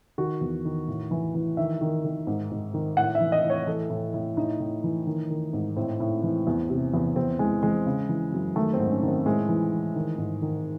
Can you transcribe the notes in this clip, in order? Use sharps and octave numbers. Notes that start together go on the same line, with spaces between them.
D#3 F#4
E2
D#3
A2
E3
E3
D#3 E5
D#3
D#3
G#2
G#2
D#3
A2 F#5
E5
E3
D#5
A2
C#5
E3 A4
A2
A2
A2 D#4
A2
E3
D#3
D#3
G#2
A2 C4
A2
E3
E2
C3
E2
E2 C4
E3 G#3
E3 G#3
C#3
E3
F#2
D#3 A3
C4
G#2
C#4
D#3
C4
A2 G#3
E3
E3
D#3
G#2
D#3